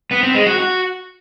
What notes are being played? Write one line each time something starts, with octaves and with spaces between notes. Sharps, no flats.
B3
C4
G#3
F#4
F#4